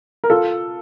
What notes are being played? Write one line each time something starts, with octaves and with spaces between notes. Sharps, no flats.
A#4
F4 A4